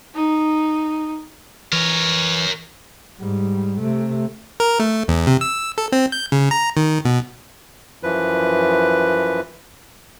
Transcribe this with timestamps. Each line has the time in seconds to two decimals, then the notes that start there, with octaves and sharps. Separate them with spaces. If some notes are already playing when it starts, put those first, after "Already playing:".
0.15 D#4
1.73 E3 A#4 C#5
3.19 G#2 G3
3.81 C3 A3
4.60 A#4
4.80 A3
5.08 E2
5.27 C3
5.41 E6
5.78 A4
5.92 C4
6.12 G6
6.32 C#3
6.51 A#5
6.77 D#3
7.05 B2
8.03 F#2 E3 F3 B4